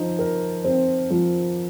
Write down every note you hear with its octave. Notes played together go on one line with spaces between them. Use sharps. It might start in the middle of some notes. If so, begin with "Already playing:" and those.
Already playing: F3 D#4
A#4
C4
F3